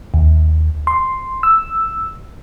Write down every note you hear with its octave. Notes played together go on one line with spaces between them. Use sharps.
D#2
C6
E6